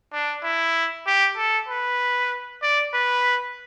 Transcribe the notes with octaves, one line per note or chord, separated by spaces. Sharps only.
D4
E4
G4
A4
B4
D5
B4